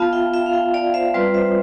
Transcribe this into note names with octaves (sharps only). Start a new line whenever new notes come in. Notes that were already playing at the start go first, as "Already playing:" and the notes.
Already playing: B3 F4 F5 A5
E5 G5
E5 G5
F5
E5 G5
D5 F5
C5 E5
G3 C4 F4 B4 D5
C5 E5